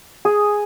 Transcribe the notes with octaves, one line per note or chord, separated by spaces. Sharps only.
G#4